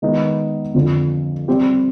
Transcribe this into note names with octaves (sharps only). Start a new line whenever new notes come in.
D#3 G#3 B3 D#4 B4
F2 D3 F3
G3 C4 G4